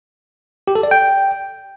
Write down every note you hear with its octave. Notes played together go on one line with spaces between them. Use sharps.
G4
A4
D5
G5